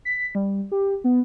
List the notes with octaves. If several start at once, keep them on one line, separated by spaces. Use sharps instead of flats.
B6
G3
G4
B3